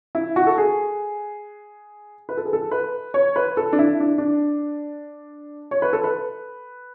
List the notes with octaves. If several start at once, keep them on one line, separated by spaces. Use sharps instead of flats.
E4
F#4
A4
G#4
B4
A4
G#4
A4
B4
C#5
B4
A4
D4
E4
D4
D4
C#5
B4
A4
B4